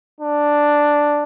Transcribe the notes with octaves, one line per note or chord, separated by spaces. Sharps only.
D4